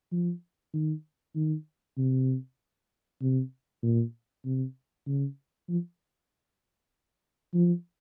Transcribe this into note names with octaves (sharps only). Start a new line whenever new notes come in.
F3
D#3
D#3
C3
C3
A#2
C3
C#3
F3
F3